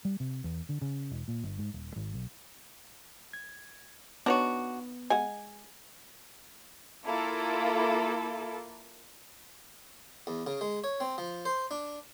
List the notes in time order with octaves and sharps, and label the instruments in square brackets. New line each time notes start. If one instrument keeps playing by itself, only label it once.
[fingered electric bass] G3
C3
E2
D3
C#3
E1
A#2
G1
G#2
D#1
G#1
B1
[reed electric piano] G#6
[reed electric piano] B3 [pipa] D4 F#4 [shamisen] D#4 C#5
[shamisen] G#3 F#5 [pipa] G#5
[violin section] A#3 E4 F4 A4
[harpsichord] E2
C#3
G#3
C#5
C4
F3
C5
D4